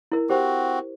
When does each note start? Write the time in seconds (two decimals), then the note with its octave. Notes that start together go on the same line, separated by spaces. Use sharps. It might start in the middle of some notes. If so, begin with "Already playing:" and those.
0.12 E4 A#4
0.29 C4 F#4 G4 C5